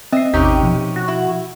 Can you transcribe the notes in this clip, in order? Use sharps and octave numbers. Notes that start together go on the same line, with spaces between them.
C4 D#5 E5 C7
A1 E2 C3 C#4 D#4 G4
B2 F3
F#4
E4